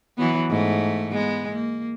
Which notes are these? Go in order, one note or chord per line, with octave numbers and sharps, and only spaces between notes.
E3 F#3 B3
G#2 A3
G#3 B3
A#3